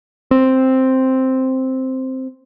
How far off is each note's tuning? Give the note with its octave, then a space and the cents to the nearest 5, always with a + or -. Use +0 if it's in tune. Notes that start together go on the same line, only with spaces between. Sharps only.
C4 +0